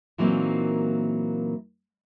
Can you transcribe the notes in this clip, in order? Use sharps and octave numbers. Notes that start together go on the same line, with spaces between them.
A#2 E3 F#3 A#3 C4 D#4